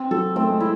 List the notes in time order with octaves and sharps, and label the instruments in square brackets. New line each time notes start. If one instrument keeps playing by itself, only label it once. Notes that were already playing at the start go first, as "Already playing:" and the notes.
Already playing: [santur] C4
[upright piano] F#3 [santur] A4
[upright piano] A3 [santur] C4
[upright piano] G#3
[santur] E4